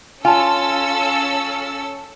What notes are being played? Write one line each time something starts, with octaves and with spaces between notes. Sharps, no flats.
C#4 F4 A4 G#5 A5 E6